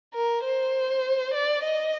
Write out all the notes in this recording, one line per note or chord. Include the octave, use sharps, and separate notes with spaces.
A#4
C5
D5
D#5